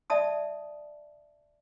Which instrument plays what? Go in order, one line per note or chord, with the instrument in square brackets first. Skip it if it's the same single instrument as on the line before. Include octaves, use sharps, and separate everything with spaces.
[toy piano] D5 E5 A5 D#6